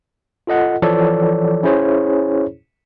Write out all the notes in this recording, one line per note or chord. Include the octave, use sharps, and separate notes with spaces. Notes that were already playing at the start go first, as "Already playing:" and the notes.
F4 A4 D#5 F#5
E3 F3 A4 C#5 D5
C#4 E4 G#4 C5 C#5